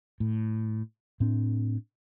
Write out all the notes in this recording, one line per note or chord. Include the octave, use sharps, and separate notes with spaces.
A2
A2 C4 D4